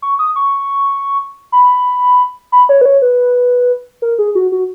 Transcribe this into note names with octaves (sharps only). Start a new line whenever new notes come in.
C#6
D#6
C#6
B5
B5
C#5
B4
C#5
B4
A#4
G#4
F#4
F#4